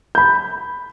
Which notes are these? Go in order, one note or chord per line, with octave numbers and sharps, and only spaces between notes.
B5 G6